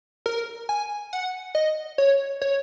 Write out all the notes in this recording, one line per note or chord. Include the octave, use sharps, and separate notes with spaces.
A#4
G#5
F#5
D#5
C#5
C#5